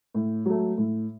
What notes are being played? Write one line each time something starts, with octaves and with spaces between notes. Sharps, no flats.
A2
F#3 A3
A2